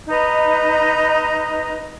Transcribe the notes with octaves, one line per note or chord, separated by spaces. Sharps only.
D#4 B4 D#5 A#5